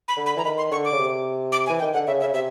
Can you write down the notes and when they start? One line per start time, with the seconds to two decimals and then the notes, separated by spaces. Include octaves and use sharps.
0.08 B5
0.17 D3
0.26 B5
0.36 E3 A#5
0.44 D#3 B5
0.58 C6
0.71 D3 C#6
0.85 D6
0.92 C#3
0.99 C3
1.52 D6
1.67 G#5
1.70 E3
1.79 D#3 G5
1.94 D3 F#5
2.07 C#3 E5
2.20 E5
2.23 C#3
2.33 C3 E5